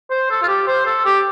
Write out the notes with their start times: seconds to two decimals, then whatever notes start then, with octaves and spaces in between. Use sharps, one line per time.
0.10 C5
0.30 A4
0.42 F4
0.48 G4
0.68 C5
0.86 A4
1.05 G4